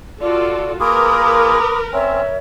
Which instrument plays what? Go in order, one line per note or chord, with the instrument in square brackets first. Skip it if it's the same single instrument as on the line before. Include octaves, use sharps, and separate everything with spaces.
[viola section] F4 F#4 A4 [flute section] D5
[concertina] A#3 F4 G#4 [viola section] A#4 B4 [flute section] B5 D6 D#6
[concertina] C4 C#4 [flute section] C#5 E5